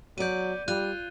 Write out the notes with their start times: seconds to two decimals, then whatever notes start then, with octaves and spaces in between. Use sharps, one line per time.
0.18 F#3 B3 D5 G6 D#7
0.68 G3 F4 F#6 D#7